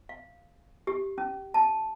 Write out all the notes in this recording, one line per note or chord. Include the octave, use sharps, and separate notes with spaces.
F5
G4
C#4
A5